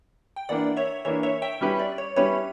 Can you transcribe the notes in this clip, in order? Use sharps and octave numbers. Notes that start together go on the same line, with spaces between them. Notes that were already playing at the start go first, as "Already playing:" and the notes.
G5
E3 A#3 D4 D5 F#5
C#5 E5
E3 A#3 D4 C#5 E5
C#5 E5
E5 G5
G3 C#4 E4 G4 B4
D5
C#5
G3 C#4 E4 G4 B4 C#5